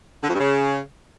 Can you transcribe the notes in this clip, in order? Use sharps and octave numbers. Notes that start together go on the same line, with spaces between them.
D3
F2
G2
C#3